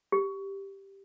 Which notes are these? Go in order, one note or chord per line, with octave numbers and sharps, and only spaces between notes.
G4